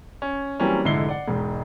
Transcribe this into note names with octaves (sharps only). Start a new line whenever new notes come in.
C#4
E3 F#3 G3 A#3 C4 C#4
F1 G#2 D3 E4 C7 G7
D5 F#5
E1 G#2